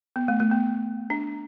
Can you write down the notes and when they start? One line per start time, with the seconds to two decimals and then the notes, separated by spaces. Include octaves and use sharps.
0.16 B3
0.28 A3
0.40 A3
0.51 B3
1.10 D4